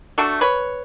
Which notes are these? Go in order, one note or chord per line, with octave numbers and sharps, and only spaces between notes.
A3 D4 F#4 A4
B4 C#5